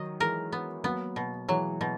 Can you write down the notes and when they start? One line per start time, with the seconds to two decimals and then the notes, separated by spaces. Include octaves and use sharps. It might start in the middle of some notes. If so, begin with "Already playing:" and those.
Already playing: D#3 F#3 D#5
0.20 E3 G#3 A#4
0.52 B3
0.84 F#3 A#3 B3
1.16 B2
1.48 E3 F#3 G#3
1.81 B2